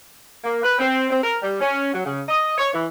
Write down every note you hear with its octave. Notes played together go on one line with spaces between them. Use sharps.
A#3
B4
C4
C4
A#4
G3
C#4
F#3
C#3
D#5
C#5
E3